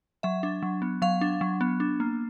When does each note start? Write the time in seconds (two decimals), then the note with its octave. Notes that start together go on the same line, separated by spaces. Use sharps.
0.23 F#3 E5
0.43 D4
0.63 F#3
0.82 B3
1.02 F#3 F5
1.21 D4
1.41 F#3
1.61 B3
1.80 D4
2.00 A#3